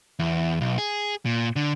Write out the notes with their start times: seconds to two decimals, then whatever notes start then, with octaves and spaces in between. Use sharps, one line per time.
0.19 E2
0.61 B1
0.78 G#4
1.26 A#2
1.56 D3